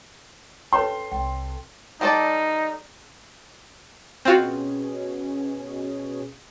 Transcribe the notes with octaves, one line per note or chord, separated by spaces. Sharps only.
C#4 A4 B4 C#5 G5 C6
C2 G5
G3 D#4 A4 D5
B2 C4 C#4 F4 F#4 G#4